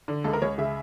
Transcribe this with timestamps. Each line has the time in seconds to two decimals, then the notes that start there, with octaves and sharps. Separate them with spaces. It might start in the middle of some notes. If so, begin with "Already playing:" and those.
0.08 D3
0.24 C#2 A4
0.33 A#4
0.42 C#2 C#5
0.58 C#3 E5